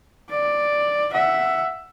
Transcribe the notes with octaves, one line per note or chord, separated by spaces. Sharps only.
D5
E5 F#5